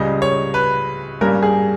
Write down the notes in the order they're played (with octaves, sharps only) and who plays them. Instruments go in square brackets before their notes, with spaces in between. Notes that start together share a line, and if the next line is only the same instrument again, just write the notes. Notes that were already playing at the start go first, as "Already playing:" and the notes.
Already playing: [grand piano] C#2 C#3 G3 D#5
C#5
B4
G2 G3 A#3 C#4 A#4
G#4